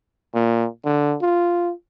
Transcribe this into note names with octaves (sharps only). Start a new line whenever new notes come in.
A#2
D3
F4